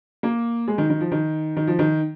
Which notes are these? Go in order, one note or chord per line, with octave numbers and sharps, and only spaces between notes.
A#3
G#3
D#3
D#3
F3
D#3
D#3
F3
D#3